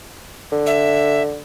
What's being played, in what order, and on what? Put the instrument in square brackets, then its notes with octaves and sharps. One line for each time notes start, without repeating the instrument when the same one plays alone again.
[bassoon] D3
[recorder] E5